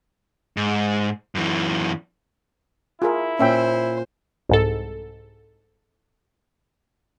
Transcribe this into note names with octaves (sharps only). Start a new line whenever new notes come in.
G#2
F#2 E3
E4 F4 G#4 A#4
A#2 C#4 C5 E5 G5
C2 G#2 A4